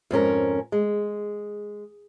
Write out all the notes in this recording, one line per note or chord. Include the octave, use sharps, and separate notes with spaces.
F2 G#2 C#4 A#4
G#3